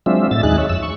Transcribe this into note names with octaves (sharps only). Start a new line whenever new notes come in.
F#3 G#3 C4 D4 F4 E5
A2 E5 A6
D#2 G#3 D#4 G#4 F#6
C#5 E5
F2 E6
C#6